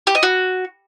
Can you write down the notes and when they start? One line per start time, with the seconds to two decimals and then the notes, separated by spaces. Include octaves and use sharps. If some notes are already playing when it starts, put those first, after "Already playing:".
0.07 G4
0.15 D#5
0.23 F#4